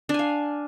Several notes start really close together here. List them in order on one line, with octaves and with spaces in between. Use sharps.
D4 G#5 F5